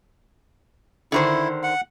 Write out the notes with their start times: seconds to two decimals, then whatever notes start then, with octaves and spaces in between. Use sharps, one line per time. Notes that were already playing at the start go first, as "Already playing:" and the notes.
1.12 D3 D#3 E4 C5
1.63 F#5